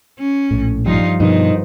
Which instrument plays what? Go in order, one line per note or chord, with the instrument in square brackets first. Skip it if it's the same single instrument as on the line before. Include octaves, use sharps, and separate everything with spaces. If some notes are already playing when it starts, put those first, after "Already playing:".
[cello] C#4
[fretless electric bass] A#1 A2
[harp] G2 F3 [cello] D#4 F4
[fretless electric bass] G2 B2 F3 [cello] D#3 [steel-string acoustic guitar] D#4 [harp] B4 C5